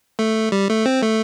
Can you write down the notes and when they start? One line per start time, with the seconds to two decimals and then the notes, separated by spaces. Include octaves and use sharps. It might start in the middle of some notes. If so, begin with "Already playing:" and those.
0.19 A3
0.52 G3
0.70 A3
0.86 C4
1.03 A3